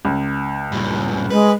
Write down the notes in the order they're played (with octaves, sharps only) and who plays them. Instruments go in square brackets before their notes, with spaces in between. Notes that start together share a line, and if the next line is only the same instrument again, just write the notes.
[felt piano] C#2
[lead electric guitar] G2 A#2
[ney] G#3 [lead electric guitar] B4